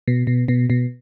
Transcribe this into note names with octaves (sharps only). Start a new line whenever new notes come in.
B2
B2
B2
B2